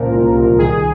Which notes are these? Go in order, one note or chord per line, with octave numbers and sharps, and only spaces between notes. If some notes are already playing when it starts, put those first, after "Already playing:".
Already playing: C#2 A#2 F3 A#4
C2
C2
D#3 G#4